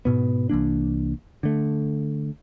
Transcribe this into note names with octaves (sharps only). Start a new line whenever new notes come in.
G#2 B2 B3
C2 E3 A#3 D4
D3 A3